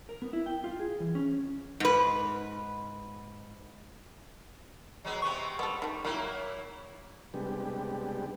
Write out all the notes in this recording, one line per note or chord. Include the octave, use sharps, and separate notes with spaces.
A#4
B3
E4
G5
F4
G#4
E3
C#4
G#2 B4
F#3 G#3 B3
C3 B3 C4 C#6
G3 B3 A4
D#3 A3
D#3 F#3 A#3 E4
C3 G3 G#3 B3 D4 G4